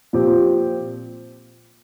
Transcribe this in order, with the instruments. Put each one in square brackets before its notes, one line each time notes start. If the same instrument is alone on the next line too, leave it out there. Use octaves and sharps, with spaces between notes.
[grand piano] A#2 F3 C4 G4